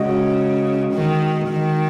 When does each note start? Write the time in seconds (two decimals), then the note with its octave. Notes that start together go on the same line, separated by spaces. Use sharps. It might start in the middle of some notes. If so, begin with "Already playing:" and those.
Already playing: C#3 G#3 F#4 D#5
0.94 D#3
1.48 D#3